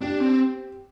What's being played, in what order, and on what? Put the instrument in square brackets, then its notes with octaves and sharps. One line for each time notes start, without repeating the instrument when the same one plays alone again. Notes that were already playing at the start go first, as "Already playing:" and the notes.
[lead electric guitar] D4 [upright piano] G4
[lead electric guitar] C4